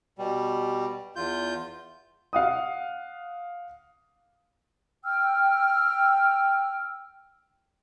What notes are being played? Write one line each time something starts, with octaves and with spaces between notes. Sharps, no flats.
B2 G3
E2 F4 G6
F5 F#5 D#6
G5 E6 F6